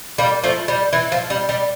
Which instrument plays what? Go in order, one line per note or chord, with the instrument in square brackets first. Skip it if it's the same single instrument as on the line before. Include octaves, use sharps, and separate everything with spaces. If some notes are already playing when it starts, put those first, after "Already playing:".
[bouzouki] G3 A#3
F3 A3
G3
E3
F3
G3
G3